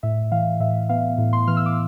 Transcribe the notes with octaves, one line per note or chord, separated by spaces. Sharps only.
A2 E5
E3 F5
A2 E5
B3 F5
A2
C6
E3 F6
E6
D6